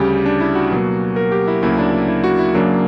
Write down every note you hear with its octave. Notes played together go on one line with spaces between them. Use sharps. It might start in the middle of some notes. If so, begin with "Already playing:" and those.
Already playing: D2 C#3 G3 G4
D4
E4
F#4
B2 F#3 A#3
A#4
G4
E4
D2 C#3 F#3 A#3 E4
D4
E4
F#4
E4
F#2 C#3 F#3 A#3 D4